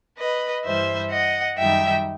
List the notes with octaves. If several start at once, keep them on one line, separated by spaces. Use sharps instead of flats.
B4 D#5
G2 E3 G3 C5 E5
D#5 F#5
F#2 D#3 G3 D#4 E5 G5